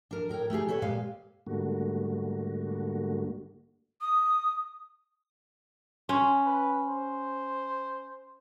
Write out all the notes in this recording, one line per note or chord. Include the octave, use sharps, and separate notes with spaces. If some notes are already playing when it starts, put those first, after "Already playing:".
D4 A#4
A2 A#4 C#5 G5
A3 D#4 G4 G#4
A4 B4 C#5
A#2 G#3 G4 B4 F5
G#2 D3 G3 A3 A#3 F#4
D#6
C#4 C6
B4
C5